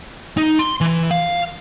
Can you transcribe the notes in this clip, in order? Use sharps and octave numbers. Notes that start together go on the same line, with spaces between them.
D#4
C6
E3
F5